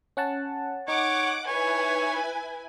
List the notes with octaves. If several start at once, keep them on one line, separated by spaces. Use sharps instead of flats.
C#4 F#5 A5
D#4 C#5 F#5 D6
E4 B4 C#5 G#5